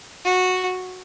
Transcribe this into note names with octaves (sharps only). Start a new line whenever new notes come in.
F#4